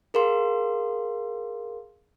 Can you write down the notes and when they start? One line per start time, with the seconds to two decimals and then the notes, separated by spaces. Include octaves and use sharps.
0.14 G#4 A#4 F5 C6